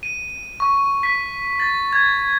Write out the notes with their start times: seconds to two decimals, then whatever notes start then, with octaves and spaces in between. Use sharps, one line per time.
0.03 D#7
0.60 C#6
1.03 B6
1.60 A6
1.93 G#6